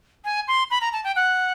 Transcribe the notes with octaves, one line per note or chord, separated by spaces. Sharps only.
G#5
C6
B5
A#5
A5
G5
F#5